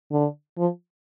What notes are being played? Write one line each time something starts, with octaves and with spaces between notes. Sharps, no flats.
D3
F3